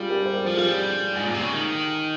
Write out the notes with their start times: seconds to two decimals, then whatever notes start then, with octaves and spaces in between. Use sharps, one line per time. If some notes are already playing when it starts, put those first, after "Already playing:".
Already playing: G3 F4 G4 G#4
0.10 G4 A#4
0.26 C5
0.33 G4 A#4
0.46 F3
0.57 G3 F4 G#4
1.16 G#2
1.25 A#2
1.34 C3
1.43 C#3
1.52 D#3